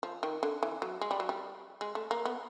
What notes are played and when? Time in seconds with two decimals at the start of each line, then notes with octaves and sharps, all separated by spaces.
0.03 F3
0.23 D#3
0.43 D3
0.63 E3
0.82 F#3
1.01 G#3
1.11 G3
1.20 F#3
1.29 G3
1.81 G#3
1.95 A3
2.11 A#3
2.25 B3